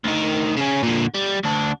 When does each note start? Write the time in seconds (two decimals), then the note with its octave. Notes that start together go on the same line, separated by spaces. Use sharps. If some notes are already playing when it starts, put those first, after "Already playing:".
0.04 D2 D#3
0.57 C#3 C#4
0.83 A#2 D3
1.14 G3
1.44 D2 D4